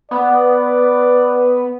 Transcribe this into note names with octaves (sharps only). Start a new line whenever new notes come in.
B3 D5